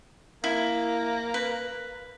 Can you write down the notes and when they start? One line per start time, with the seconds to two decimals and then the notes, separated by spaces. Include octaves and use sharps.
0.44 A#3 E4
1.34 B4